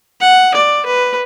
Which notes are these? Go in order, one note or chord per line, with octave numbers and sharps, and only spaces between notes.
F#5
D5
B4